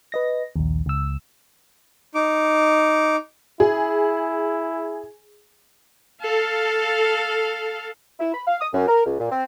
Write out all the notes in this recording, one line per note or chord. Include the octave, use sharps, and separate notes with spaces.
B4 D#5 A#6
A#1 D#2
C#2 E6
D#4 D6
E4 G#4
A4 F5
E4
B5
F5
D#6
F#2
A#4
C#2
A#2
C4